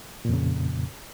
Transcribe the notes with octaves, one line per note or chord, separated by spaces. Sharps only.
F2 A#2 C#3